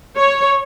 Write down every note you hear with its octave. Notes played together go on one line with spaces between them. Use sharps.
C#5